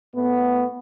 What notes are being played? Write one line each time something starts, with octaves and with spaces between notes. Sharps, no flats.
A2 A3 B3